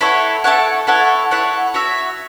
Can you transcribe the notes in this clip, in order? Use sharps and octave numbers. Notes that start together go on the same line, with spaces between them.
E4 A4 C#5 F#5
E4 A4 C#5 F#5
E4 A4 C#5 F#5
E4 A4 C#5 F#5
F#4 C#5 E5